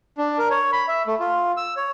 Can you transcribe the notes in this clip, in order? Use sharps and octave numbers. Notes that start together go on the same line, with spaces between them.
D4
A#4
C#5
B5
E5
A3
F4
E6
C#5